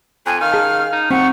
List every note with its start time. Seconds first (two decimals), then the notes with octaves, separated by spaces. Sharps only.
0.26 F2 G5 G#5
0.41 D#3 F5 F6
0.53 G#4 A5
0.93 D#4
1.11 C4 D#4 F#5 C#6